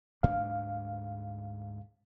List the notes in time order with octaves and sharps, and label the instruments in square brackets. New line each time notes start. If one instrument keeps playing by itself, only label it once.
[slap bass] D2 G#2 D4 [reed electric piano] F5